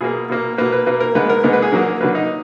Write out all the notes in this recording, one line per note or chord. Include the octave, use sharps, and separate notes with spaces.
B2 A#3 G#4
B2 A#3
B2 A#3 B4
B4
B2 A#3 B4
A#4
D3 G#3 B3 B4
A#4
D3 G#3 B3 A#4
B4
G#4
D3 F#3 A#3 A#4
D3 F#3 A#3 B4
D#4